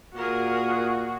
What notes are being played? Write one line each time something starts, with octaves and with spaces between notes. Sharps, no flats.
A#2 F#4 G#4 A#4